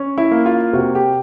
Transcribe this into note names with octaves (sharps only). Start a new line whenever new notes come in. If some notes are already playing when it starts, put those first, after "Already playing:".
Already playing: C#4
E4
A#3
F4
C3 F#4
G4